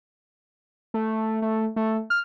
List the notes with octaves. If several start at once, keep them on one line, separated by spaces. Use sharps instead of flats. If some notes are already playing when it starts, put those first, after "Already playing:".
A3
A3
A3
F6